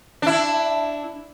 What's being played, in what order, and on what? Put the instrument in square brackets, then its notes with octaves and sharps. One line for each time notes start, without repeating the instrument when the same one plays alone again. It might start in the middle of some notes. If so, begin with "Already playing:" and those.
[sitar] D4 E4